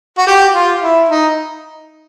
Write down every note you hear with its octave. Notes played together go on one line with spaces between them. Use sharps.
F#4
G4
F4
E4
D#4